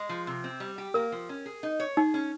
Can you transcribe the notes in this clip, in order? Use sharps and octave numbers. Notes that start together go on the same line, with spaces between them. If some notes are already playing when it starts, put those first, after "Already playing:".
Already playing: G#3
F3
C3
C4
G3
G4
A#3 A#4
F3
C#4
G#4
D#4
C#5
D#4 G#4
C#4